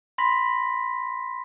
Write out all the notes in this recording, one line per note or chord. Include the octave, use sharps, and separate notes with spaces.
B5 C6 A#6 B6